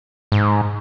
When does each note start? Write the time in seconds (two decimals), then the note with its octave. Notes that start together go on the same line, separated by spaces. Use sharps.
0.32 G#2